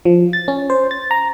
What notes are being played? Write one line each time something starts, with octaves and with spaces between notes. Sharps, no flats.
F3
A6
C#4
C5
A6
A#5